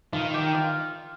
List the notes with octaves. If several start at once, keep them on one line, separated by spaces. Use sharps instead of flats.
D#3 F4
G4
F4